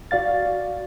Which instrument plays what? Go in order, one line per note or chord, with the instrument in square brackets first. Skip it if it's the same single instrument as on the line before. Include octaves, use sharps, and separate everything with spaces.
[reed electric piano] F#4 D5 F5 A6